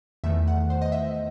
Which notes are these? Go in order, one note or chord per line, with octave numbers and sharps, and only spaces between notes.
E2 D#3 A3 E5
F#5
C5
D#5
E5